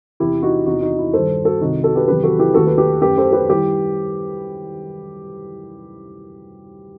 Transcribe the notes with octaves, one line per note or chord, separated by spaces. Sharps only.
E2 C3 E3 E4 G4
D#4 F#4
E2 C3 E3 D#4 F#4
D#4 F#4
E4
G2 D#3 G3 A4 C5
F#4 A4
C2 C3 D#3 D#4 F#4
F#4 A4
G4 B4
E2 C3 D#3 F#3 G4 B4
F#4 A4
E4 G4
D#2 D#3 A3 F#4 A4
G4 B4
G4 B4
F#2 E3 A3 G4 B4
A4 C5
G4 B4
D#3 G3 E4 G4